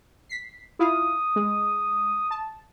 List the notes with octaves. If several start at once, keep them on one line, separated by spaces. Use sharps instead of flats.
B6 C7
E4 F4 F5 D#6
G#3
A5